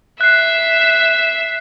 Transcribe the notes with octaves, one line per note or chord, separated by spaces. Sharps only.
E5 F#6 C7